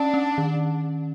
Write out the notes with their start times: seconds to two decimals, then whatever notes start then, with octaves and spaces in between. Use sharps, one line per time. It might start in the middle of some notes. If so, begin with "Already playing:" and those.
Already playing: C#4 D4
0.14 C#4
0.38 D#3